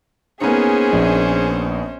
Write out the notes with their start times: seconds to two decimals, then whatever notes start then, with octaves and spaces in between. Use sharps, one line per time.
0.41 A#3 B3 C#4 D#4 G#4 C5
0.93 A#1